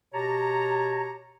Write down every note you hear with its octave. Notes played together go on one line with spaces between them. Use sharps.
B2 G4 C#5 A5 A#5